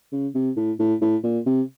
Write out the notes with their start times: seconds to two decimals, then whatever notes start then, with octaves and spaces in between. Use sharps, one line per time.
0.12 C#3
0.35 C3
0.57 A2
0.79 A2
1.02 A2
1.24 A#2
1.47 C3